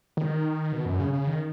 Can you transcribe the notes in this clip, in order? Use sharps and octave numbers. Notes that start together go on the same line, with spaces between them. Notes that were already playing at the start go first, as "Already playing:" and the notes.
D#3
B2
F#2
C#3
C#3
D#3